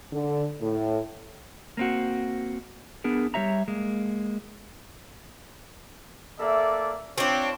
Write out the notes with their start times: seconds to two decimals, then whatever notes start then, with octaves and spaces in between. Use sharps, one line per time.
0.12 D3
0.61 A2
1.77 A#3 C4 F#4
3.04 B3 D4 G#4 A#4
3.34 G3 G4 C#5 E5 A#5
3.68 G#3 A#3
6.39 A#3 A4 D5 E5
7.18 C4 D4 F4 C#5